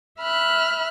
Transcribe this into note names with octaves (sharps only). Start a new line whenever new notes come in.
E5 B5 F6 F#6